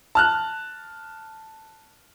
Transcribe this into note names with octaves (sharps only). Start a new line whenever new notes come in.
A5 F6 F#6